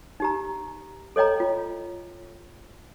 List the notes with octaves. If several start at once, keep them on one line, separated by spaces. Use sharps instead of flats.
D#4 G4 A#5
A4 C#5 D#5 G5 A#5
F4